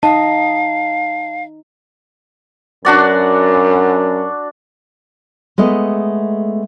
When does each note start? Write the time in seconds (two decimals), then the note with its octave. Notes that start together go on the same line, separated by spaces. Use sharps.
0.03 D#4 D#5 F5 A5
2.85 F#2 D4 F#4 D5
5.58 G#3 A3 B3 D#5